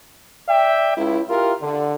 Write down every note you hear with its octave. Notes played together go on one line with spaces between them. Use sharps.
D5 E5 G5
C#2 E4
E4 F4 G4 A#4
D3